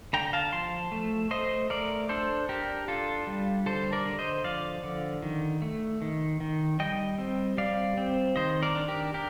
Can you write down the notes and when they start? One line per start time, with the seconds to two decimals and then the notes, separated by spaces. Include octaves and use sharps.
0.13 D3 G5 A#5
0.33 F5 A5
0.53 F3 A5 C6
0.92 A3
1.31 A3 C5 D#5
1.70 A3 A#4 D5
2.09 D4 A4 C5
2.49 D4 G4 A#4
2.88 D4 F4 A4
3.27 G3
3.66 D3 A4 C5
3.93 A#4 D5
4.05 D3
4.19 C5 D#5
4.44 F3 D5 F5
4.83 D3
5.22 D#3
5.62 A3
6.02 D#3
6.40 D#3
6.79 G3 D#5 G5
7.18 C4
7.58 G3 D5 F5
7.97 C4
8.36 D#3 C5 D#5
8.63 A#4 D5
8.75 D4
8.88 G4 A#4
9.14 D4 G4 A#4